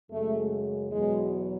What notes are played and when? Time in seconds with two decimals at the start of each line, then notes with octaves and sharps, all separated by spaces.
0.11 F#2 C#3 G#3 A3
0.92 E2 B2 F#3 G#3